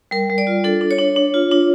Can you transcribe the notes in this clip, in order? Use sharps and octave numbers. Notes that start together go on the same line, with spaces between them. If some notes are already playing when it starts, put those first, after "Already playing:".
G3 A#4
G3
D5
F4
D4 A4
D4
C#5
D4
D4
F4
D4